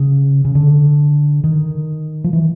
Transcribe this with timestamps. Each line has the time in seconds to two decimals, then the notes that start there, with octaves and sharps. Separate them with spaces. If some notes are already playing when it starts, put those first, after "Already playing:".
Already playing: C#3
0.45 C#3
0.55 D3
1.44 D#3
2.24 F3
2.33 E3